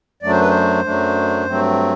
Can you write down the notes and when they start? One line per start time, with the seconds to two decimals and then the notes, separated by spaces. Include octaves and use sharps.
0.23 F#2 F#3 A3 D4 D5
0.32 C5
0.41 B4
0.50 C5
0.84 F#2 F#3 A3 D4
1.45 G2 F#3 A3 C4